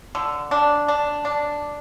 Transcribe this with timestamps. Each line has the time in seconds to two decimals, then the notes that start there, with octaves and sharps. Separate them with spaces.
0.15 D3
0.51 D4
0.88 D4
1.25 D4